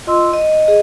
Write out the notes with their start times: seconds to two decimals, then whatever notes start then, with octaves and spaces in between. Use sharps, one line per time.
0.07 F4 D#5 C6 E6
0.33 D#5
0.67 G#4 D#5